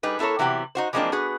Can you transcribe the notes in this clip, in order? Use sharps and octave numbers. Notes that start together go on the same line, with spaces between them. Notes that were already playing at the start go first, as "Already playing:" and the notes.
G3 D#4 G#4 B4
B3 E4 A4 A#4 C#5
C3 E3 F#3 B3 G4
D#4 F#4 C5
E3 F3 G#3 A#3 C4 D4
B3 F#4 G#4 B4